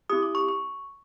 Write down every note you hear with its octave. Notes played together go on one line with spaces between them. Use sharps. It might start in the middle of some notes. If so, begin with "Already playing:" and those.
C4 E4 G4 D#6
D6
C#6
C#6